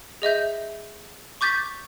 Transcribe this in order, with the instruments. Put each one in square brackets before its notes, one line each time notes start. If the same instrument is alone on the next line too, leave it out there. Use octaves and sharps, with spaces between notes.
[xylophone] G#4 D#5 E5 G6
C#6 D6 G6 A6 B6